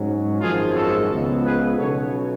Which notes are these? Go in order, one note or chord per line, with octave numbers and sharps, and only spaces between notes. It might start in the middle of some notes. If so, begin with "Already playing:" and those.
Already playing: G#2 F#3 C#4
G#1 F#2 F3 G#3 F4 G#4
F#4 A4
C#2 C#3 F3 B3
G#4 B4
B1 B2 F#3 C#4 A4 C#5